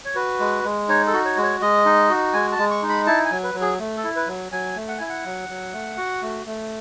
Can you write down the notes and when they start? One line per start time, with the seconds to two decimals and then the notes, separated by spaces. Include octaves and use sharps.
0.05 C#5
0.15 F#4 B4
0.40 G#3
0.64 G#3
0.89 D#4 C#5
1.07 A4
1.13 F#4
1.25 C#5
1.37 G#3
1.43 C#5
1.61 G#3 D#5
1.85 D#4
2.10 F#4
2.33 G#3 G#5
2.52 A5
2.58 G#3
2.71 C#6
2.83 D#4
2.89 B5
3.07 E4 A5
3.25 G#5
3.31 F#3
3.43 B4
3.54 F#3
3.61 G#4
3.79 A3
3.97 A4
4.04 E4
4.16 B4
4.27 F#3
4.52 F#3 G#5
4.76 A3
4.88 F#5
4.98 E4 G#5
5.09 F#5
5.25 F#3
5.49 F#3
5.73 A3
5.97 F#4
6.22 A3
6.46 A3